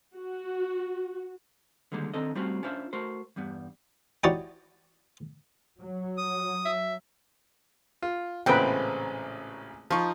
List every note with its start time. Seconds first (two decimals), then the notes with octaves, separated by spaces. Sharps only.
0.17 F#4
1.92 D3 D#3 G3 G#3 A#3
2.14 D#3 C4 D4 A4 D5 D#5
2.35 G3 A3 C4 C#4 F4 F#4
2.63 C#4 D4 F4 C5 E5
2.93 A3 F#4 A#4 C5
3.36 E2 G2 G3 B3
4.24 D#4 E4 F#4 G4 C#5 D5
5.80 F#3
6.18 D#6
6.65 E5
8.02 F4
8.46 A1 A#2 C#3 G#3 A3 C4 B4 G5
9.91 F3 D#4 F4 C#6